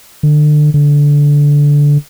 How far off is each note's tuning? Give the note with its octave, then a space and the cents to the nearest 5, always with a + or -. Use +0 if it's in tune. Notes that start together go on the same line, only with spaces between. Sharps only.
D3 +30
D3 -15